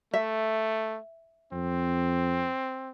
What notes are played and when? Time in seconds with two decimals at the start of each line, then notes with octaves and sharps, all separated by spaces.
0.14 A3 E5
1.52 F2 C4